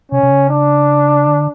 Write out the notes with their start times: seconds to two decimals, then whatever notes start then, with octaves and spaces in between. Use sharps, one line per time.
0.12 C3 C#4
0.23 C3
0.31 C#3
0.50 D4
1.27 D3